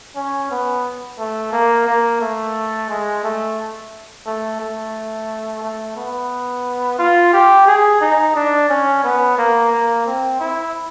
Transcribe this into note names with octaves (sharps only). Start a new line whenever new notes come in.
C#4
B3
A3
A#3
A#3
A3
G#3
A3
A3
A3
A3
B3
F4
G4
G#4
D#4
D4
C#4
B3
A#3
A#3
C4
E4